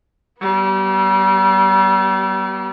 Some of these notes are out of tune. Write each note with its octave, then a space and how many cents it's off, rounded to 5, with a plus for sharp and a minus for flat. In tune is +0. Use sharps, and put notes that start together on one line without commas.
G3 -35 B3 -20